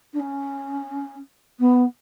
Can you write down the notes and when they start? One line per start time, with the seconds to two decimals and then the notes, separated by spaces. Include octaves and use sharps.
0.13 D4
0.20 C#4
1.59 B3